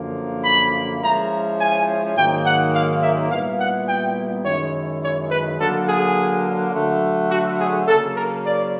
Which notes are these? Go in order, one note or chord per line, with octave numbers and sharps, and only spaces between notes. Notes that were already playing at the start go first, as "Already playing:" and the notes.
Already playing: F#2 D3 F3 A#3
B5
F3 G#3 C#4 E4 A#5
G#5
G#2 D#3 F#3 A#3 D#4 G5
F#5
F5
E5
A#2 G3 B3 E4 F5
F#5
G5
F#2 D#3 G#3 C#4 E4 C#5
C#5
B4
D3 F#3 A#3 A4
G#4
D3 F#3 A3
F#4
G#4
C#3 F#3 A#3 A4
A#4
D5